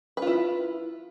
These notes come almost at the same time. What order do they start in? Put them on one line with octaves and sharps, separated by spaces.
B4 F4 E4